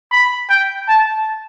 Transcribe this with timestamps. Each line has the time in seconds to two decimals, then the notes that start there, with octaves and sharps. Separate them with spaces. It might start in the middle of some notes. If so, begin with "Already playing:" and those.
0.12 B5
0.50 G5
0.88 A5